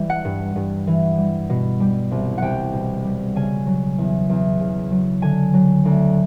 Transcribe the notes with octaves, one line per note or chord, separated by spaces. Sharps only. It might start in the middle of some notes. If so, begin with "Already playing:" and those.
Already playing: E3 G3
F#5
G2
G2
E3
G3
B2
G3
C2
C2 F#5 G5
B2
G3
C#3 G#5
F#3
E2
E2
C#3
F#3
D3 G#5
F#3
D2